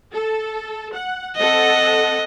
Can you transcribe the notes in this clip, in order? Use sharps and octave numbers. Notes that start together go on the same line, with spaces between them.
A4
F#5
C4 A4 D#5 F#5